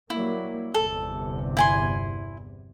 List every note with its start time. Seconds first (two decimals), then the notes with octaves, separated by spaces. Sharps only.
0.10 F#3 G3 A#3 E4
0.74 G1 E2 C3 A4
1.57 E4 G#5 C6